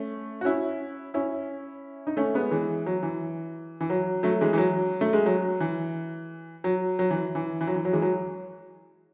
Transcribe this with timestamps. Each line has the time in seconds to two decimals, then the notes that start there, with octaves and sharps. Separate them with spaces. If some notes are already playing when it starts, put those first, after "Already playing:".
Already playing: A3 C#4
0.41 F#4
0.45 C#4 E4
1.14 C#4 E4
2.07 D#4
2.17 A3 C#4
2.34 G#3 B3
2.51 E3 G#3
2.86 F#3
3.03 E3
3.81 E3
3.90 F#3
4.23 F#3 A3
4.41 E3 G#3
4.53 E3
4.58 F#3
5.01 A3
5.13 G#3
5.26 F#3
5.60 E3
6.64 F#3
6.99 F#3
7.10 E3
7.35 E3
7.61 E3
7.67 F#3
7.75 E3
7.85 F#3
7.93 E3 G#3
8.02 F#3